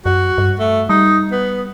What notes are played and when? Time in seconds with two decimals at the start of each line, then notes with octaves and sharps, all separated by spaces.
0.06 F#2 F#4
0.38 G2
0.60 A3
0.89 G3 D#4
1.32 B3